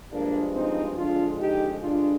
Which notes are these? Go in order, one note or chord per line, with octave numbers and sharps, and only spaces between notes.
G2 F3 G#3 A#3 D4
C4 D#4
F2 D3 G#3 D4 F4
D#4 G4
G2 D3 G#3 D4 F4